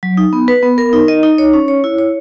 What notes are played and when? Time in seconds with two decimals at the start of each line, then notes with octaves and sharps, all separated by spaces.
0.03 F#3
0.17 D#4
0.33 B3
0.48 B4
0.63 B3
0.78 A#4
0.93 D#4
1.08 D#5
1.23 D#4
1.38 C#5
1.53 C#4
1.68 C#5
1.84 E4
1.98 C#5